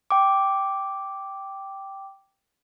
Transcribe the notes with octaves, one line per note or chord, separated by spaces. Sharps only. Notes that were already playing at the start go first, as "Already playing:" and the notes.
G5 D6